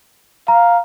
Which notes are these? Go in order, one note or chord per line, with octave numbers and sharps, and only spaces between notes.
F5 A#5